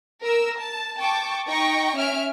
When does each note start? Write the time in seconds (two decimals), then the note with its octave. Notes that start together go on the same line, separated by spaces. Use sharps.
0.24 A#4 E6
0.58 A5
0.98 G5 A5 C#6 D6
1.48 D#4 G5 C#6 A#6
1.96 C#4 E5 F6 D7